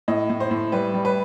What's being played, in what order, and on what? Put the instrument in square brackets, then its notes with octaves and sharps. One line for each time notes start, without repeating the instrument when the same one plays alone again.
[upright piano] A2 D#5
A2
C5
A2
G3 B4
G3
B4